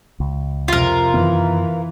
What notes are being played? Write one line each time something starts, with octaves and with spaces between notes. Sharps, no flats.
C#2
F2 C3 F4 A#4
F#2 D#3 E3 B3